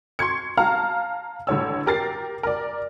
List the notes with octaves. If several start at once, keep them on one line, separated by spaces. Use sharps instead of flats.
C6 C#6 G#6 C#7
F5 A5 A#5 F6
A1 D3 C#5 E6
G4 A#4 A6 C7
A#4 D5